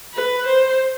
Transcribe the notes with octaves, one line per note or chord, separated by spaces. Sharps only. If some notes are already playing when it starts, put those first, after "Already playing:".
B4
C5